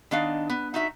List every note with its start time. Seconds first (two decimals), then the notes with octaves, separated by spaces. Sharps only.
0.11 D#3 B3 D4 D#5 F5
0.50 B3
0.74 D#4 F#4 E5